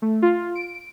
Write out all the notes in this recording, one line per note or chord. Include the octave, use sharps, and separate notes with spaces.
A3
F4
D7